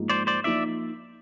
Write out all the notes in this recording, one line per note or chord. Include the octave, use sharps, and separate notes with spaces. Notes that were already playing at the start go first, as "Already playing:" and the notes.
Already playing: G#2 F3 A#3 D#4
C5 D5
C5 D5
F3 A#3 D#4 D5 E5